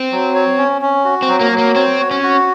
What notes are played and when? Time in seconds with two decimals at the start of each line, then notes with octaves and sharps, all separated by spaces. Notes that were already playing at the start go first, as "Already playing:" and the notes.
Already playing: C4
0.12 F#3
0.35 C#5
0.58 C#4
0.82 C#4
1.05 F#4
1.22 C4
1.28 F#3
1.41 A#3
1.51 F#3
1.58 A#3
1.75 C4 C#5
2.00 F#4
2.11 C#4
2.22 F#4